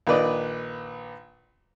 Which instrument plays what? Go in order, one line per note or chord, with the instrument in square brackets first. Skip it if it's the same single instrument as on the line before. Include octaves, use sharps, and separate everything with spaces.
[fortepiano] A#1 D#3 B4 D5 D#5